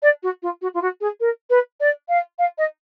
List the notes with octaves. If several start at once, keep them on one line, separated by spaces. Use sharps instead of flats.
D5
F#4
F4
F#4
F4
F#4
G#4
A#4
B4
D5
F5
F5
D#5